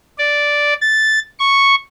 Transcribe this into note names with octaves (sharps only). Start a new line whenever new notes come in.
D5
A6
C#6